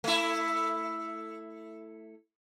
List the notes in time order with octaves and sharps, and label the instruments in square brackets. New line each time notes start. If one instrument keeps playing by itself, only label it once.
[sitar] A3 E4